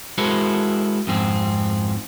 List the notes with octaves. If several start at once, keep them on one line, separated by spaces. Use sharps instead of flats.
G#3 E4 F#4 A4 A#4 C5
F2 G#2 C4